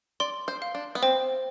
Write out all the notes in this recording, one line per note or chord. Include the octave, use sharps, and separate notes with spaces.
D5 C6
C5
F5
D4
B3
C4 C5